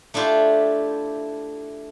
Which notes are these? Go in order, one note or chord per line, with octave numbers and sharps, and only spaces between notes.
A3 D4 E4 F4 G4